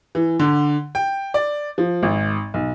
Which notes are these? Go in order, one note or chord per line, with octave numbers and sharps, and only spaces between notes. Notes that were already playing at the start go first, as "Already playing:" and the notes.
E3
D3
G5
D5
F3
G#1
B1